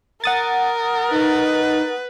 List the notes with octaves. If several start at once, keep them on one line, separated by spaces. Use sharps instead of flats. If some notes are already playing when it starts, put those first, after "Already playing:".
A#4 F#5 D#6 A6
D#4 B4